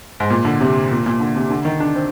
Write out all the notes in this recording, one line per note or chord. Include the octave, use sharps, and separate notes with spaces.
G#2
A#2
D3
C3
A#2
A#2
D3
C3
D3
D#3
D4
C4